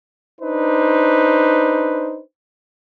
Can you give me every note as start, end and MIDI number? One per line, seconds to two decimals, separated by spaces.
0.41 2.22 62
0.41 2.22 63
0.41 2.22 71
0.41 2.22 72